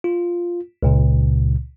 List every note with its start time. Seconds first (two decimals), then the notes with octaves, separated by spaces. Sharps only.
0.04 F4
0.83 C#2 A#2 C#3